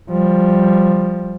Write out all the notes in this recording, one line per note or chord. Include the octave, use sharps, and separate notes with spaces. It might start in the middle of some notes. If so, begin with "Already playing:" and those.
F3 G3